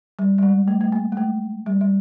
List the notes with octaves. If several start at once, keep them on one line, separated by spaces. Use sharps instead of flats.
G3
G3
G#3
A3
A3
A#3
G#3
A3
G3
G3